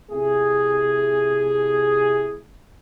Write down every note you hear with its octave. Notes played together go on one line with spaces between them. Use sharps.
C3 A3 E4 G#4